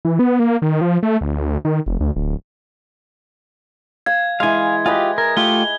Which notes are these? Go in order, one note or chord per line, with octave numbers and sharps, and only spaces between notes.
E3
B3
A#3
D#3
F3
A3
D2
D#3
F1
D2
D1
F5 G#6
E3 G#3 F5 G#5
F4 G4 B4 D#5 G#5
A#4 G#6
A3 F4 G4 G7